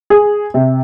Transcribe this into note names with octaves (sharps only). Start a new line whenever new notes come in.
G#4
C3